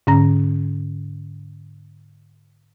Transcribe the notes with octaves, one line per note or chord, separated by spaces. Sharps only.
G#2 D3 C#4 A#5 A#6